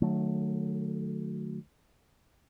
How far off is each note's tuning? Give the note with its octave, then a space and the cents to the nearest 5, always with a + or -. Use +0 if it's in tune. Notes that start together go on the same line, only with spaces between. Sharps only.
D#3 -45 F#3 -10 A3 -5